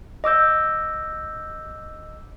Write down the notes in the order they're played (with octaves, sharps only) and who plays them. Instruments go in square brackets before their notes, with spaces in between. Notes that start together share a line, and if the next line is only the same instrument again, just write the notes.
[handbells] D#5 D6 E6 G6